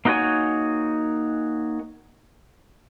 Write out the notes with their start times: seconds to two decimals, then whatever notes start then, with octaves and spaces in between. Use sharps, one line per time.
0.05 A#3 D#4 F#4 A#4 C#5 G#5